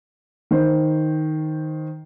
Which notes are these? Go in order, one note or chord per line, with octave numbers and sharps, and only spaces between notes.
D#3 C5